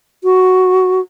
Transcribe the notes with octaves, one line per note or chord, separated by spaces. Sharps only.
F#4